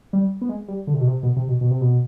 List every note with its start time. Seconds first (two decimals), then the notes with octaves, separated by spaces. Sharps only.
0.13 G3
0.41 B3
0.49 G#3
0.68 G3
0.87 D3
0.94 C3
1.00 B2
1.07 C3
1.23 B2
1.37 C3
1.49 B2
1.61 B2
1.71 C3
1.81 B2